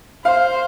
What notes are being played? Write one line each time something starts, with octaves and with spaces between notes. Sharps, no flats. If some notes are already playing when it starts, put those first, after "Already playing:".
C5 F5